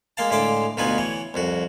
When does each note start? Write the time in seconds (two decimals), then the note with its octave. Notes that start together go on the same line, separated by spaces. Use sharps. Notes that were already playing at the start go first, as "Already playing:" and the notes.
0.17 G#3 A#3 F5 A5
0.30 A2 D3 G#3 E5 F5 D6
0.77 D2 B2 D#4 F4 B4 G#5
0.98 E3 C#5
1.34 C2 F2 F#4